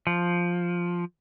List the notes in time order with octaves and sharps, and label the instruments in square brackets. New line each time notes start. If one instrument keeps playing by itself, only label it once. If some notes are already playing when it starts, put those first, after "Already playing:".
[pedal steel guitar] F3